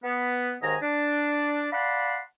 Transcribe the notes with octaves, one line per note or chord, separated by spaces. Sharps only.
B3
D#2 G#2 D#3 D#5 G#5 A#5
D4
D5 F5 F#5 A5 B5 C6